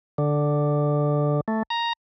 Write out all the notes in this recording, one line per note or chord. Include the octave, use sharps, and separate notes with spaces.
D3
A3
A#5